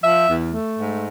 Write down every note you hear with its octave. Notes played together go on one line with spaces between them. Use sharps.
F3 E5
E2
A3
G#2